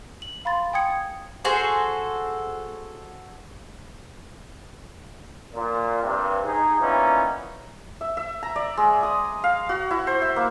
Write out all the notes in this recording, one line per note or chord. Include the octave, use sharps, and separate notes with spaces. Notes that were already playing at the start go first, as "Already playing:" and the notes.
F#7
F5 B5 C6 A6
G5 G#5 D#6 G#6 C#7
F#4 G#4 A4 C5
A#2
G2 C3
D#4 G#4
A#2 E3 A#3 B3 C#4 D#4
E5
E5
A#5
D5
G#3
D#6
F5
F#4
E4
C5
E5
A#3